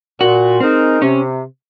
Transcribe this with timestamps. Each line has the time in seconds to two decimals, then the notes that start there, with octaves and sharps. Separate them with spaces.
0.20 A#2 F#4
0.60 G#3 C4 D#4 A#4
1.02 C3 C#4